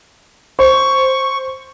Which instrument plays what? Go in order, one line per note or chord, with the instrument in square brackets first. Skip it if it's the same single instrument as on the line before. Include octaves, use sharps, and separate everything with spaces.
[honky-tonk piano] C5 [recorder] C#6